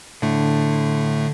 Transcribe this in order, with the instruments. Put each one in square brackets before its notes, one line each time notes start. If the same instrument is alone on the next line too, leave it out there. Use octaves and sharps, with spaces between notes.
[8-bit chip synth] A2 A3 [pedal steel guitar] D3